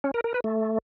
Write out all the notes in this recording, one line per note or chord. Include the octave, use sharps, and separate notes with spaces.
C#4
A#4
A#4
B4
A3